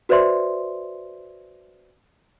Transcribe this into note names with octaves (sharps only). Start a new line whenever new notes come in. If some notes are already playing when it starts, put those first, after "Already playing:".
F#4 B4 C5 D5 E5 C6